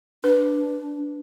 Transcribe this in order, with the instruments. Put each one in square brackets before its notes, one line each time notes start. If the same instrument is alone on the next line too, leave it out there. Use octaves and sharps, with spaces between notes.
[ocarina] D4 [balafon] B4